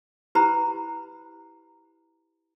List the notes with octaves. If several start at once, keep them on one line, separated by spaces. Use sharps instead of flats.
E4 G4 B4 C5 A#5 B5